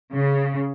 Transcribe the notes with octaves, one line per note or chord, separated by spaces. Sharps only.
C#3